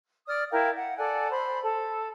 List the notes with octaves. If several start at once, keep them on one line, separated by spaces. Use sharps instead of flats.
D5 D#6 F6
E4 A#4 F5 G5
F#5
A4 D5 F#5 G#5
C5 B5
A4